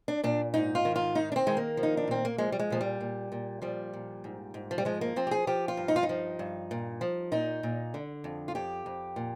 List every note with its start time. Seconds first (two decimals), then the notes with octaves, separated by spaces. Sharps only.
0.08 D4
0.23 A#2 D4
0.54 G#2 D#4
0.75 F4
0.85 D#3
0.96 F4
1.15 D#3 D#4
1.32 D4
1.36 C4
1.46 D#3 G#3
1.57 A#3
1.77 F3
1.83 D#4
1.97 D4
2.08 A#2 C4
2.25 A#3
2.38 F3 G#3
2.52 G3
2.59 G#3
2.70 A#2 F3
2.81 G3
3.00 A#2
3.32 A#2
3.62 F3 G3
3.93 A#2
4.24 G#2
4.54 G#2
4.71 F3
4.78 G3
4.85 F3 G#3
5.01 A#3
5.16 F3 C4
5.27 G4
5.31 G#4
5.47 F3 G4
5.68 F4
5.77 G2
5.88 D#4
5.96 F4
6.03 D#4
6.09 F3
6.39 G2
6.71 A#2
7.01 F3
7.32 A#2 D#4
7.63 A#2
7.94 D3
8.24 F2
8.48 F4
8.55 F2 G4
8.86 F2
9.16 A#2